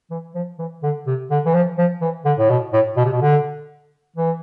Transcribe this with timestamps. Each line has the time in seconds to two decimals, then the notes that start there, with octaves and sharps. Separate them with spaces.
0.11 E3
0.35 F3
0.59 E3
0.83 D3
1.07 C3
1.31 D3
1.46 E3
1.54 F3
1.78 F3
2.01 E3
2.25 D3
2.39 A2
2.50 B2
2.73 A2
2.97 B2
3.05 C3
3.12 B2
3.22 D3
4.17 E3